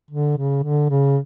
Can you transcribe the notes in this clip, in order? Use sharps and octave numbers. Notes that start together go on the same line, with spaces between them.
D3
C#3
D3
C#3